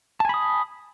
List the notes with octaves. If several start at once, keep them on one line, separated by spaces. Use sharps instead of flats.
G#5 A5 B5 D#6